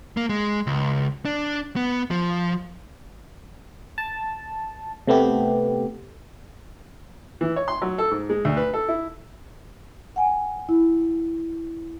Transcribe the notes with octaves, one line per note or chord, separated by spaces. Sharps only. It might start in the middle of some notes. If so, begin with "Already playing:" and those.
A#3
G#3
C#2
D4
B3
F3
A5
C3 A3 B3 G4
E3
C#5
C6
F#3
A4
G#2
G#3
D2
B4
A4
E4
F#5 G#5
E4